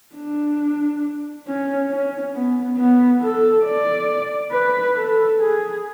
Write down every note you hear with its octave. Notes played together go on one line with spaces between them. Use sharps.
D4
C#4
C#4
B3
B3
A4
D5
B4
A4
G#4